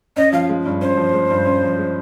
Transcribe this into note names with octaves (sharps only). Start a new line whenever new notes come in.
C#4 D#5
F3 F5
G#3
G2
C#4 C5
F3
G#3
G2
C#4
F3
G#3